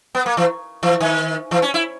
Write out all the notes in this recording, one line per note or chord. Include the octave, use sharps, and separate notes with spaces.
B3
A#3
E3
E3
D#3
E3
C#4
E4